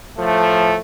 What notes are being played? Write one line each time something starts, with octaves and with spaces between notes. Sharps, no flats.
A2 F3 A3